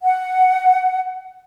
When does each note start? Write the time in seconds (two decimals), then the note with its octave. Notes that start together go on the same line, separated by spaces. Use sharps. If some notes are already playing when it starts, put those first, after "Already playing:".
0.02 F#5